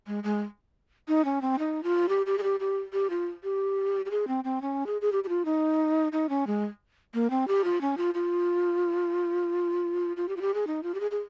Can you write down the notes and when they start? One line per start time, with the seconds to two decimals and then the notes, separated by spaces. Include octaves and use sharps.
0.07 G#3
0.24 G#3
1.08 D#4
1.25 C#4
1.42 C4
1.59 D#4
1.83 F4
2.09 G4
2.26 G4
2.38 G#4
2.43 G4
2.60 G4
2.93 G4
3.10 F4
3.43 G4
4.05 G4
4.11 G#4
4.28 C4
4.44 C4
4.62 C#4
4.86 G#4
5.01 G#4
5.12 G4
5.24 G4
5.29 F4
5.45 D#4
6.12 D#4
6.29 C#4
6.47 G#3
7.14 A#3
7.30 C4
7.48 G4
7.64 F4
7.81 C#4
7.97 F4
8.14 F4
10.17 F4
10.29 G4
10.36 F4
10.41 G4
10.54 G#4
10.67 D#4
10.83 F4
10.94 G4
11.00 G#4
11.11 G#4